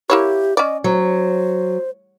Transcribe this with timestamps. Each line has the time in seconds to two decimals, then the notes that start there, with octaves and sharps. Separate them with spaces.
0.10 A#3 E4 G4 C#5
0.57 C#4 D5 D#5
0.84 F#3 C5